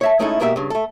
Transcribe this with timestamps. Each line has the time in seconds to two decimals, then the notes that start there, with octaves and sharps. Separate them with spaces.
0.01 C#5 E5 A5
0.19 G#3 A3 C#4 D#4 E4 A4
0.40 G#2 B2 A#3 G4 B4 E5
0.56 G2 C#3
0.70 A3 A4